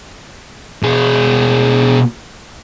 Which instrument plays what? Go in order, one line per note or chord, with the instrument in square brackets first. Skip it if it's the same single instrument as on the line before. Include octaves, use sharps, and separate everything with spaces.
[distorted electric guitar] B2 G#4